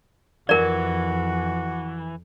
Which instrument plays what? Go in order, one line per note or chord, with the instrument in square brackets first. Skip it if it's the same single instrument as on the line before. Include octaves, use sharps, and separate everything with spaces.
[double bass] F2 [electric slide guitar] E3 [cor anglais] F#4 [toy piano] A#4 D5